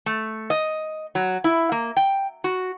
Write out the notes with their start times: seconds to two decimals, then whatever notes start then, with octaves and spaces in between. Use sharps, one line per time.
0.06 A3
0.50 D#5
1.15 F#3
1.44 E4
1.72 A#3
1.97 G5
2.44 F#4